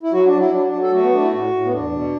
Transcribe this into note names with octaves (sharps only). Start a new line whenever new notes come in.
E4
F#3 F#4
D4
F#3
E4
F#3 D4
D4
F#3
A4
A3 F#4
B3
A3 D4
E4
A2 F#4
A2
B3
E2 D4
B2